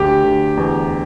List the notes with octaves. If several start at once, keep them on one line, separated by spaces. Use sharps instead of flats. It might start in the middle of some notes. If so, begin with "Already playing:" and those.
Already playing: D2 G4
D2
E2